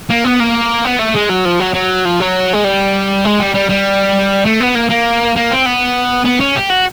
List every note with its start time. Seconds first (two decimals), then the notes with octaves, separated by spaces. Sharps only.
0.10 A#3
0.25 B3
0.40 A#3
0.85 B3
0.99 A3
1.15 G#3
1.29 F#3
1.45 F3
1.60 F#3
1.74 F#3
2.05 F3
2.20 F#3
2.53 G#3
2.64 G3
3.25 G#3
3.39 G3
3.54 G3
3.69 G3
4.45 A3
4.60 B3
4.75 A#3
4.90 A#3
5.36 A#3
5.51 C4
5.66 B3
6.25 B3
6.40 C#4
6.56 G4
6.70 F#4